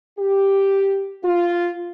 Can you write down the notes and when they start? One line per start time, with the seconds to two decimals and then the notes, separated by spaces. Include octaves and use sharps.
0.19 G4
1.24 F4